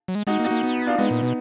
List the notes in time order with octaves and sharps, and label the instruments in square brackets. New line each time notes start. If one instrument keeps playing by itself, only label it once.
[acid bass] F#3
G#3
[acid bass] G#3 [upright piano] D#4 F#4
[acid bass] A#3
[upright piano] D#4 F#4
[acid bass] A#3
B3
[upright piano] D4 F4
[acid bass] G#3 [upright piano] B3 D#4
[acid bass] A#2
B2